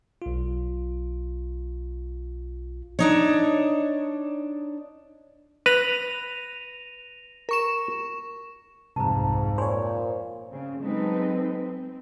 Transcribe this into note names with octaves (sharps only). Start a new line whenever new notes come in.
B1 F4
D4 D#4 C#5
B4 A#6 D#7 F7
A#4 C#6 E7
C2 F2 G#2 A5 A#5
A#2 C5 C#5 G#5 B5 C6
C#3 C4
F#3 G#3 C4 D#4 A4 B4
C4